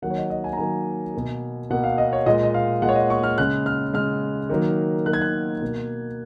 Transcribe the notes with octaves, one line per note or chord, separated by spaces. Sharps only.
D#3 F#3 A#3 F#5
C#5
D#5
D#5
G#5
A#5
D#3 F#3 A#3 G#5
B2 A#3
B2 A#3 F#5
F5
D#5
C#5
A#2 G#3 D#5
D#5
F5
A#2 G#3 F#5
C#5
D#5
C#6
F6
C#3 G#3 F#6
F6
C#3 G#3 F6
D#3 F#3 A#3
D#3 F#3 A#3 F#6
G#6
F#6
B2 A#3